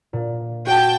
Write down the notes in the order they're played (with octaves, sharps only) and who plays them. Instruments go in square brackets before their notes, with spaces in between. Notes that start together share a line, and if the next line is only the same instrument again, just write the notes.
[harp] A#2
[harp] F#4 [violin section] G5 A5